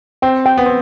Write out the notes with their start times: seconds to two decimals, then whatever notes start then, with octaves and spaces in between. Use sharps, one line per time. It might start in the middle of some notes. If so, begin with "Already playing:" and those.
0.22 C4 G5
0.46 G5
0.57 B3
0.66 C4